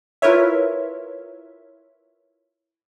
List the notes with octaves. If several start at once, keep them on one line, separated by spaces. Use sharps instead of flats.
E4 F4 A#4 B4 C#5 E5